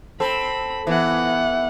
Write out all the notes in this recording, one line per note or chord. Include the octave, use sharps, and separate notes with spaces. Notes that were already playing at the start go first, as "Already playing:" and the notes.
C4 A4 B5
E3 B3 F#5